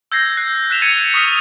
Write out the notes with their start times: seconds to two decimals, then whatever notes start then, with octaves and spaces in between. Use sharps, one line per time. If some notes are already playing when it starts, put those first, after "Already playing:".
0.12 E6 G6 G#6 A#6 C7
0.37 F#6 C7
0.70 F#6 B6 E7 F7 G7
0.82 G#6 A6 C#7 D#7 F7
1.14 C#6 D#6 F6 A6 B6 F7